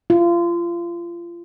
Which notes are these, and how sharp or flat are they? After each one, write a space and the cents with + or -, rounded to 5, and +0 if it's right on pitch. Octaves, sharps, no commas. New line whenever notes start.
F4 -30